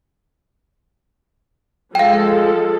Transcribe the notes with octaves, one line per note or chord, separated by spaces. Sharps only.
F3 G#3 A4 F5 G5